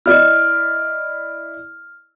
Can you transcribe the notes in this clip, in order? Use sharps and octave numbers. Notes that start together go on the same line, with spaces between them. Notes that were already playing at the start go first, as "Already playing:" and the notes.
E4 D5 D#5 F6